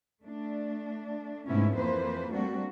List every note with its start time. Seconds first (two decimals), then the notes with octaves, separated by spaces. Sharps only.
0.23 A3 D4
1.46 G#2 C3 A3 B3 C#4 E4
1.75 F2 E3 A#3 B4 C5
2.32 G3 A3 A#3 C4 D4 F#4